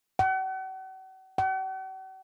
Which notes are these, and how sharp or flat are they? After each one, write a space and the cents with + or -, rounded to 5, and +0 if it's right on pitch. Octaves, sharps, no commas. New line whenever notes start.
F#5 +40
F#5 +45